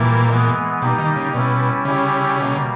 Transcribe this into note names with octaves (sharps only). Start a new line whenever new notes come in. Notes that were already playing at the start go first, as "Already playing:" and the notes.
Already playing: A#2 E3 G3 A#3 E4
E3 G#3 B3
B2 G3 A#3 D#4 G4
D#3
C#3
B2 G3 C#4 E4
C#3 G3 C#4 E4 G4
B2 G3 A#3